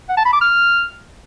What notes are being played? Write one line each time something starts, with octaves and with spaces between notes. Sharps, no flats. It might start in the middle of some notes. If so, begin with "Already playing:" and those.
F#5
A5
B5
D6
F6